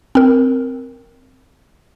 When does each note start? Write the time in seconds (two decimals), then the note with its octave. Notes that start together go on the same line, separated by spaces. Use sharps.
0.15 C4 A#4